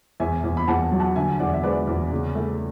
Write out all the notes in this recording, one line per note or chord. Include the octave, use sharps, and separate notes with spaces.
E2 E5 G#5
E2
B5
E2 F#5 A5
F#3
F#5 A5
D3 E5 G#5
E2 D5 F#5
E5
G#3 B4 D5
E2
C#3
A3